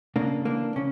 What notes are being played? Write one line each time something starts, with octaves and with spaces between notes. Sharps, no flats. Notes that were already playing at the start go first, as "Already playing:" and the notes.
C#3 A#3 D4
E3 A#3 D4
C#3 C#4